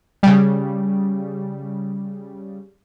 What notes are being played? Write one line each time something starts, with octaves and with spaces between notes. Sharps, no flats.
C#3 G3